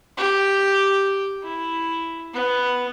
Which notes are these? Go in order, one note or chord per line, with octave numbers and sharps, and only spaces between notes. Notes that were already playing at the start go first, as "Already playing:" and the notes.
G4
E4
B3